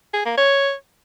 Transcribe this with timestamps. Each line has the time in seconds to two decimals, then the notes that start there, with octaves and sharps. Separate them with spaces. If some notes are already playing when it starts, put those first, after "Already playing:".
0.13 G#4
0.25 A#3
0.37 C#5